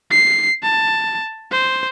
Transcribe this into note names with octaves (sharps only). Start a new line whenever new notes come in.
C7
A5
C5